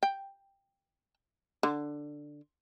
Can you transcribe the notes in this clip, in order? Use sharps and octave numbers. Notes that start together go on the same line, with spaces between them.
G5
D3